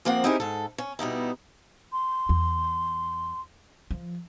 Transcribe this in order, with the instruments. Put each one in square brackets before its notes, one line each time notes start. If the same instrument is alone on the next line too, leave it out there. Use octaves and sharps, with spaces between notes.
[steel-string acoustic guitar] F2 F3 A#3 C4 F#5
C4 D#4 E4 G4 G#4 A#4
G#2 A4
C#4
B2 G3 D#4 E4
[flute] C6
[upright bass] E2
F3